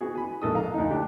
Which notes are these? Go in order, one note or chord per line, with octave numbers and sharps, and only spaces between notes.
B3 F#4 G#4
G#5 B5
A#1 G#2 A4 A#4 D#6
F5 A#5
D2 D#4
D4 G4